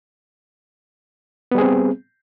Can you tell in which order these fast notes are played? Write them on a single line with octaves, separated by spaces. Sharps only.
B3 G3 G#4 C4